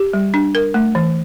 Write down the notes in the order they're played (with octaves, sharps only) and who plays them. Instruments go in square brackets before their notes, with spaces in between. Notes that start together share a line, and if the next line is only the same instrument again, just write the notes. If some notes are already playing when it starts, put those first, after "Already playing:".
Already playing: [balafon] G4
G3
D4
A#4
A3
E3